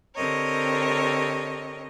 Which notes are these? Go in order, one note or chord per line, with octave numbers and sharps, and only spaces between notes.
D3 C4 G4 A#4 C#5 D#5